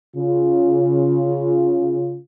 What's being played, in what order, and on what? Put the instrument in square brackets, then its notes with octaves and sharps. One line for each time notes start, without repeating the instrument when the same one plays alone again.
[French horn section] C#3 F4